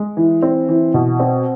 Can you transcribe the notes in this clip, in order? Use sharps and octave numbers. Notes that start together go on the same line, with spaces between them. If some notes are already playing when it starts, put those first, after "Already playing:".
Already playing: G#3
E3
C4
E3
B2
C4